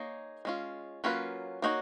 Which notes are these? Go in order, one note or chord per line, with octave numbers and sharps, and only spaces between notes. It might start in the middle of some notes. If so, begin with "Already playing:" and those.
Already playing: A#3 D#4 G#4 C#5
G#3 C#4 F4
F#3 A#3 C#4 F4 B4
A#3 D#4 F#4 C#5